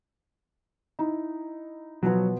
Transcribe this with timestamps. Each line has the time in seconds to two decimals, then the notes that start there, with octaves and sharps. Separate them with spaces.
0.99 D#4 E4
2.03 B2 F3 F#3 B3